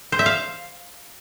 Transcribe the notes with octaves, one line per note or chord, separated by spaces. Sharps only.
C5
E5
F5